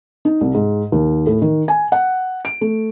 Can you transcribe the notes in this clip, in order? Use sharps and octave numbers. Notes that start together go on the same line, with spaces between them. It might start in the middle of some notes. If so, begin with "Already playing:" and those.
D#4
C2
G#2
D#2
A2
D#3
G#5
F#5
D7
A3